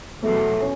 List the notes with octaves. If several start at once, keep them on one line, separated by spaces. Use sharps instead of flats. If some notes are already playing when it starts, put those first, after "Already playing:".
E2 B2 F#3 A3
C#4